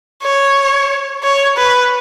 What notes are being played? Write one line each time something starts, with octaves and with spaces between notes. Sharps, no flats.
C#5
C#5
B4